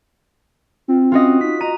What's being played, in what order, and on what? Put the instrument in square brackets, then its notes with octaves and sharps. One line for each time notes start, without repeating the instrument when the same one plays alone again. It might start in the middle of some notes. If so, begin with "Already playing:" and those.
[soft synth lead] C4 [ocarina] F4
[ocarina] C#4 [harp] F4 F#4 D#5
[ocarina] D#4 [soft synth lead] B6
[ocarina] D#5 [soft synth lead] A#5 [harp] D#7